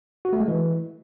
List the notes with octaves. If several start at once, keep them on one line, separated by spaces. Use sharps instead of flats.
F#4
A3
G#3
E3